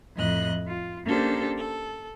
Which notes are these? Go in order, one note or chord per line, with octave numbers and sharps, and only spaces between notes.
F2 A2 D#5 F#6
F4
A#3 C#4 D4 G4 A4 C5
A4